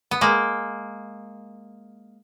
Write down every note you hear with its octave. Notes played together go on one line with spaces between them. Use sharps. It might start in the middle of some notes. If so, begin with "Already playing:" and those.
B3
G#3 A#3